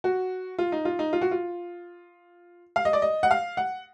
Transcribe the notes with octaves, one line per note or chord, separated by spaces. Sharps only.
F#4
F4
D#4
F4
D#4
F4
F#4
F4
F5
D#5
D5
D#5
F#5
F5
F#5